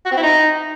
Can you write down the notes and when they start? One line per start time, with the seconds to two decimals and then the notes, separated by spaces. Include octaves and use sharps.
0.05 F#4
0.11 C4
0.17 E4
0.23 D#4